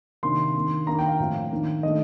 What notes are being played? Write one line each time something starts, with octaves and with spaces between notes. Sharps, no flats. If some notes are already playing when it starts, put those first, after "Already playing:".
C3 D#3 A#3 D4 C6
D#3 A#3 D4
D#3 A#3 D4 A#5
G5
F5
A2 F3 C4
D#3 A#3 D4
D#3 A3 D4 D#5